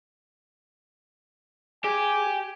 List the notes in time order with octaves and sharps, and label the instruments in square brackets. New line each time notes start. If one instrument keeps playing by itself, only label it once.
[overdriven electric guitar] G4 [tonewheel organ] G#4 [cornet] G#5